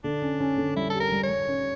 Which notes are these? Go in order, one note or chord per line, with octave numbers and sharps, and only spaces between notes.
D3 D4
C#4
C#4
D3
G3 E4
G4 A4
A#4
G3
C#5
G3
C#4